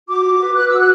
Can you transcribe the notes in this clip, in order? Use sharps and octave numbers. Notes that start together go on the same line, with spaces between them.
F#4 D6
F#4
B4
B4 F#6
F#4 E6
F#6